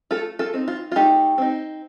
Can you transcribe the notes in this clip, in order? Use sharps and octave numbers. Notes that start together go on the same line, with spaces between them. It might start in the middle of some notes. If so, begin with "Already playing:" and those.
A3 F4 A4
F4 A4
C4 D#4
F4
F4
A3 D#4 G4
C4 D#4